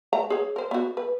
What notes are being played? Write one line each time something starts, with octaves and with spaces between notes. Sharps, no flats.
A3 F#5 A#5
G#4 C#5
A#4 C5
B3 F#4
B4